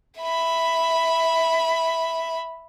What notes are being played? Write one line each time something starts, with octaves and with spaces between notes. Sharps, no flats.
E5 B5